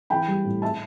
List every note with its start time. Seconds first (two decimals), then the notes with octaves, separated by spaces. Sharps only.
0.10 E3 G5 B5
0.27 G3
0.44 A2
0.62 E5 A5